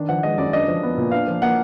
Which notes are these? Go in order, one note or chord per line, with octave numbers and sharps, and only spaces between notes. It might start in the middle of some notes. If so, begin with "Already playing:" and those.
Already playing: D#3 D4
F3 F#5
G#3 D#5
F#2 D5
D4 D#5
F3
B3
A#2
D4 F5
F3
A#3 F#5